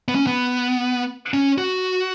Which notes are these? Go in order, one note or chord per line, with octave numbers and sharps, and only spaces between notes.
B3
C#4
B3
C#4
F#4